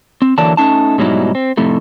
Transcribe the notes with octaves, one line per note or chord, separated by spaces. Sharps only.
C4
D3 E3 F#3 A#3 D5 A5
A3 C#4 D#4 A5
G#2 B2 F#3 G3 D#4 E4
C4
F2 A2 C3 A3